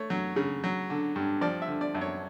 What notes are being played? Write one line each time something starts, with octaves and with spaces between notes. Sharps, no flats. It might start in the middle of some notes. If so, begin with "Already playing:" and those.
Already playing: A3 C#5
F#3
C#3
F#3
D3
G2
F3 D5
E5
D3
D5
F#2
C#5